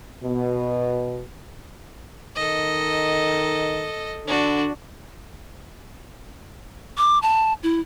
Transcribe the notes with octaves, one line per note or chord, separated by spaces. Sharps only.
B2
D#3 A4 D#5
D3 D4 F#4
D6
A5
E4